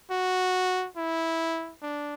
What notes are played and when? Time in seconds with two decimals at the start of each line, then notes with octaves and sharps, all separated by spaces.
0.11 F#4
0.97 E4
1.82 D4